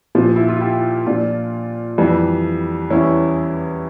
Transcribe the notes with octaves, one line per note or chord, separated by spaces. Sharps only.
A#2 F3
E4
F4
E4 G4
A#2 F3 D4 F4
F2 E3 G3
E2 E3 G3 C#4 E4